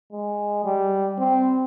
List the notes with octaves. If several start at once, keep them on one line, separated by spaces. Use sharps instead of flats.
G#3
G3
C4